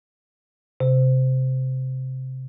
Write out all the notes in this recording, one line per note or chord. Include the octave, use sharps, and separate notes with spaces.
C3